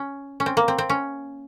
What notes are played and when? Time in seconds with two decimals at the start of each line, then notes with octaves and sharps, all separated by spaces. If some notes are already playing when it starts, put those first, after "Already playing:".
Already playing: C#4
0.40 C#4
0.46 C4
0.57 A#3
0.68 C4
0.78 C4
0.90 C#4